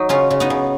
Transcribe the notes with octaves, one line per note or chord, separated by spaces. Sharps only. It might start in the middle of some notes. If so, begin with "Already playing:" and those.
Already playing: F#3 D#4
C#3 C#4 F4
C#3
B3 D#4
C#3